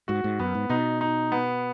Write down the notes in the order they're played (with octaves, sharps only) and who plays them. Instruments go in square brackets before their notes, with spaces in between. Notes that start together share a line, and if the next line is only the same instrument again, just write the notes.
[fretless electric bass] G#2 [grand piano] F#4
[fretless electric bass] G#2
[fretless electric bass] F#2 [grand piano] B3
[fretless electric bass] G#2
[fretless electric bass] B2 [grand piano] D#4
[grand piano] D#4
B3